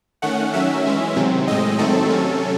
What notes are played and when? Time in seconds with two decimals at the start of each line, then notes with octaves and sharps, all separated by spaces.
0.22 D#3 A3 C#4 F#5
0.54 D#3 F#3 C#4 E5
0.85 E3 G#3 C#4
1.16 C3 D#3 F#3 C4
1.48 A2 G#3 C4 D#5
1.79 D#3 F#3 A3 C4 A4
2.10 C3 F#3 C#4